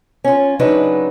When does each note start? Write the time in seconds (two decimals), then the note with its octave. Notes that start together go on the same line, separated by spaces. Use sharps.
0.24 C#4 F4
0.59 C#3 F#3 D4 D#4 B4